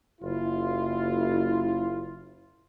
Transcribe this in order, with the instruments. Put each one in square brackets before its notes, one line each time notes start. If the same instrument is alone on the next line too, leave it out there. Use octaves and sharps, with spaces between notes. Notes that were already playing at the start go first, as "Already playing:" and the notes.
[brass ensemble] F#1 E4 F4